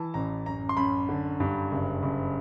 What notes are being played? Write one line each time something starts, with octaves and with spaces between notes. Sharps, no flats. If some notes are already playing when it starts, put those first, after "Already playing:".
Already playing: E3 A5
A1 A#5
F#2 A#5
C6
F#2 B5
D3
G2
F#1
F#1